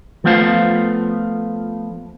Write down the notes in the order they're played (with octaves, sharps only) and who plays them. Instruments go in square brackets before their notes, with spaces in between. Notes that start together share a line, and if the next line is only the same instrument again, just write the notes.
[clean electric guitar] F3 A3 B3 F4 C5 F5